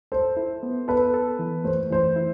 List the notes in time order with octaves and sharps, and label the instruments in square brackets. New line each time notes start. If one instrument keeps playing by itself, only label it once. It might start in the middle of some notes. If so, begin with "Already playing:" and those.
[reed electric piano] A4 [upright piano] C5
[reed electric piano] E4
B3
[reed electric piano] A4 [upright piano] B4
[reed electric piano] A4
E3
[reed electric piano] A3 [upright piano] C5
[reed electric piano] E3 [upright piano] C5
[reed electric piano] E4